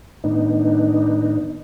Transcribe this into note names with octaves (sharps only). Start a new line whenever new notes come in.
A2 D#3 B3 D4 D#4